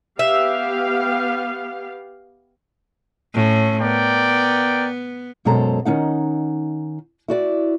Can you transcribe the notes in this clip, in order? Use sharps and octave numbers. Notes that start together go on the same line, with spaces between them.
B3 G4 E5 F5
A2 C#4
B3 A#4 D5 G5
F#2 B2 G#3 A4 C5 A#5
D#3 C#4 D#4 F#5
E4 F#4 D5